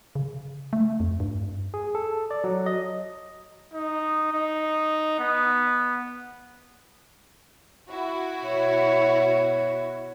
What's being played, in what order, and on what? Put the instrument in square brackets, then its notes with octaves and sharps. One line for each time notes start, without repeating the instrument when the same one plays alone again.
[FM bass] C#3
A3
F2
G2
[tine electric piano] G#4
A4
D5
F#3
D#5
[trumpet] D#4
D#4
B3
[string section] E4 F#4
[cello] B2 C#5